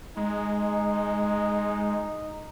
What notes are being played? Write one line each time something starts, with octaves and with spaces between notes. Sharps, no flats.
G#3 D#4